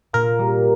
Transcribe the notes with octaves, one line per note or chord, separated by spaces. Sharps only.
A#2 A#4
G3